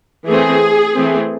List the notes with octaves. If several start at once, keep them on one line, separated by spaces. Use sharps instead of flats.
E3 A3 C4 G#4
E3 A3 C4